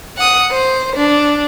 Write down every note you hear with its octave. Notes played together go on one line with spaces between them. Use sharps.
F#5 D#6
C5
D4